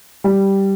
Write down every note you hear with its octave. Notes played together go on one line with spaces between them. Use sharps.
G3